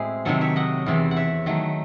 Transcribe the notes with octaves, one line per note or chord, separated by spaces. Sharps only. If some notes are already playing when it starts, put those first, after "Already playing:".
Already playing: A2 G#3 C4 E4 F#4 G#4 C5
C3 D#3 F#3 A4 C#5
C#5 E5
D#5 F#5
E2 C3 E3
F#5
C#5 E5
D#3 F#3 A3